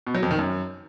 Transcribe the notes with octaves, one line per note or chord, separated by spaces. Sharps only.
B2
F#3
F2
D#3
F#2